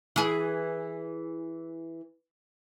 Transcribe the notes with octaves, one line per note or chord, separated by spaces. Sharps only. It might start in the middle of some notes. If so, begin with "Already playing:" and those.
E3 G#4